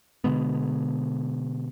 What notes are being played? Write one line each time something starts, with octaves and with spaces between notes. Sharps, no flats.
B2 D3 G#3 B3